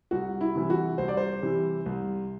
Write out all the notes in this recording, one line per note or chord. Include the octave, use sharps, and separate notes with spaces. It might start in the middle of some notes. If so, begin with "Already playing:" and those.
C2 F#4
E4
C3 E3 G3
F#4
C2 C5
D5
C5
C3 E3 G3
C2